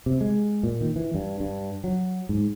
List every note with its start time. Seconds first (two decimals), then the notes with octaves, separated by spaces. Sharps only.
0.06 C3
0.21 G#3
0.63 A#2
0.81 D#3
0.96 E3
1.15 G2
1.40 G2
1.84 F#3
2.29 G#2